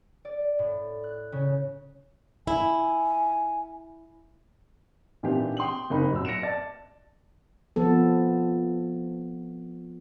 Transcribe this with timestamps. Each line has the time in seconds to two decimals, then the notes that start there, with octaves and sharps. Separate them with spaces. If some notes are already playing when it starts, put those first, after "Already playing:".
0.25 D5
0.59 A2
1.04 F#6
1.32 C#3
2.47 E4 G#5
5.23 A#2 E3 D4 D#4 G4
5.57 G5 C6 D#6 F#7
5.90 F#1 A#3 D#4 B5
6.11 F#2 A#2 E6
6.25 A#6 C#7 D7 E7
6.43 D5 A5 A6
7.76 F3 B3 A4